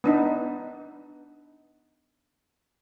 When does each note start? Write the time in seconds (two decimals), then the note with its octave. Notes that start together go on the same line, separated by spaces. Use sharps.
0.04 B3 D4 D#4